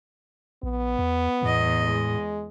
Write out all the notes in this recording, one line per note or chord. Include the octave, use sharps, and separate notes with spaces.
A#1 B3
E2
E2 A2 D#5
G#3